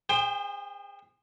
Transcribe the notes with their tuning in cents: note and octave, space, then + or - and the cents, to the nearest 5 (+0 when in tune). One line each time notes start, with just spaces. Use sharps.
G#4 -30 C5 +0 G5 +20